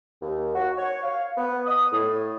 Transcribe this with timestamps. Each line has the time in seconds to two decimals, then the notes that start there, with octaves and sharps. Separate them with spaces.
0.21 D#2
0.55 F#4
0.77 C#5
1.03 F5
1.37 B3
1.66 D#6
1.92 A2